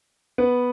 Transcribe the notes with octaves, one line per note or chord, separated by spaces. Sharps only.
B3 B4